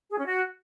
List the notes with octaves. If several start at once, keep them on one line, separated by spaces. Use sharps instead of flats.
G#4
C#4
F#4